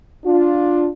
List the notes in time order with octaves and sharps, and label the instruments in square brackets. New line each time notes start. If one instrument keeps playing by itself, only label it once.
[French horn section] D4 F4